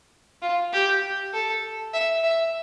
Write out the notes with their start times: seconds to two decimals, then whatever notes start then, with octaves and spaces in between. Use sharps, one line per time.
0.42 F4
0.73 G4
1.33 A4
1.93 E5
2.23 E5